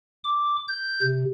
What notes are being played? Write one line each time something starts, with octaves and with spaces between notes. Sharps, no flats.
D6
G6
C3